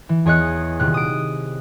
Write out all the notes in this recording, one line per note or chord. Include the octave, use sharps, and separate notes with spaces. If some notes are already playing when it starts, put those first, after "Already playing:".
E3
E2 G#4 C#5 D#5 F#6 C#7
D#1 C3 F#6
D#6 D7